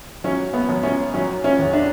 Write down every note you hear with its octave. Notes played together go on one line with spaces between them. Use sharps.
F#3 C#4
B3
F#2
C#4
F#3 C#4
C#4
E2
D4